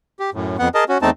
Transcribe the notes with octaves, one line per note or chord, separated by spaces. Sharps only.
G4
F#2 A2
F2 B3 F#5
G#4 A#4 D#5 A5
C#4 F#4
E2 A3 C4 D#4 A5